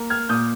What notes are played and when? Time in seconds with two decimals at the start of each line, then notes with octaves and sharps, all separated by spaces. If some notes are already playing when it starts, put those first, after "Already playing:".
Already playing: A#3
0.10 F6 G#6
0.29 A#2 D#6 G6